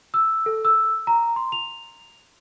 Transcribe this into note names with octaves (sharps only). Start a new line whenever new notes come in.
E6
A4
E6
A#5
C6
F7